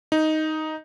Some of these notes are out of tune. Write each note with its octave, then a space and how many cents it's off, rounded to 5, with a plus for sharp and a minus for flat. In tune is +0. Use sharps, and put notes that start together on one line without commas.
D#4 +5